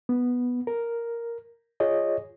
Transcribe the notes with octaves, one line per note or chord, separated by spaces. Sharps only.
B3
A#4
F4 G#4 C#5 D#5